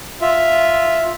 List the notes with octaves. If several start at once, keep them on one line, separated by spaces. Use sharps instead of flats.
F4 E5